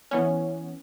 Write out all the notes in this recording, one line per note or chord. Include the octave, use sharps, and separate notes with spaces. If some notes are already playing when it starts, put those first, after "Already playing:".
E3 B3 C#4